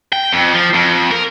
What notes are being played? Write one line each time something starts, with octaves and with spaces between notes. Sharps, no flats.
G5
F2
F3
F2
A#4